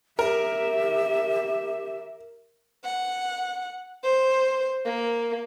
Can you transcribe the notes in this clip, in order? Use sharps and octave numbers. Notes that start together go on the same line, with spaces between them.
G4 A#4 E5
F#5
C5
A#3